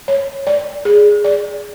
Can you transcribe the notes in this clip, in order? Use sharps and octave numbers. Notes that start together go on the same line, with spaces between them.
C#5
D5
G#4
D5